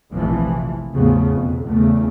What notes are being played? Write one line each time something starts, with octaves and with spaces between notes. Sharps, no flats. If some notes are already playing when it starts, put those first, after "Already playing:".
F1 A#1 E3 F3
A1 E2 C#3 F3 A3 B3
F2 B2
E2 C#3 A3